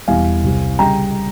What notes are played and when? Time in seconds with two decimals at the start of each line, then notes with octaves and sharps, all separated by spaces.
0.08 E1 E2 E3 G3 F5 G#5
0.44 C2 C3 G3
0.79 C#3 G3 G5 A#5